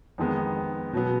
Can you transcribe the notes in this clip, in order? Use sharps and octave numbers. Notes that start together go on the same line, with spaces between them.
F2 D#3 G#3 B3
B2 F#3 B3